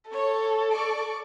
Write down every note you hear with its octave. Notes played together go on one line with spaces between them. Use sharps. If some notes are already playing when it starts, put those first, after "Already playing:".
A4 C#5
D5 C#6 D6